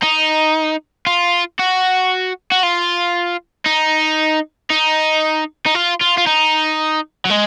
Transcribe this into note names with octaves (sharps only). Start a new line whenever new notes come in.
D#4
F4
F#4
F#4
F4
D#4
D#4
D#4
F4
F4
F4
D#4
F#3
G#3